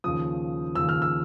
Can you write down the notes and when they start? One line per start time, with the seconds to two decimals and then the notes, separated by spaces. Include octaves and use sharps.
0.04 D#2 C#3 F3 D#6
0.75 D#2 C#3 F3 E6
0.89 F6
1.02 E6